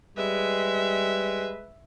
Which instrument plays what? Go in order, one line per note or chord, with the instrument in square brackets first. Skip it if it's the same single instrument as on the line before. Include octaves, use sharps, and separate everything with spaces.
[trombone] G3 [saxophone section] G#3 B4 [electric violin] E5